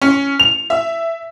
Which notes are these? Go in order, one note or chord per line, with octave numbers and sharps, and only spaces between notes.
C#4
F7
E5